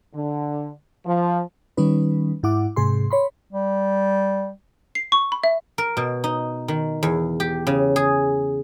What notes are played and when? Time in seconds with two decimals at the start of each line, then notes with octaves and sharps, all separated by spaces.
0.15 D3
1.06 F3
1.77 D#3 G3 C#4 D#4 B4
2.43 G#2 E4 F#5 D6
2.76 G#2 C3 G#4 C6
3.11 C#5 B5 C6
3.53 G3
4.95 C7
5.12 C#6
5.32 B5
5.44 E5
5.78 A#4
5.97 B2
6.24 D#4
6.68 D#3
7.03 E2
7.40 G4
7.67 C#3
7.96 G#4